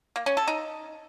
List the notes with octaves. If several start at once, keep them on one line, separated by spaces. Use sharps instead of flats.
A#3
C#4
A4
D#4